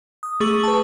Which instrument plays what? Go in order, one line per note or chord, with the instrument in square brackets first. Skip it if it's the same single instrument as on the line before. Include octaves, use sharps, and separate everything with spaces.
[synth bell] D#6
A3 G#4 C#6 F#7
B4 A5